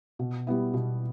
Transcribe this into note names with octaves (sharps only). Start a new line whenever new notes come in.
B2
G3 B3 E4
B2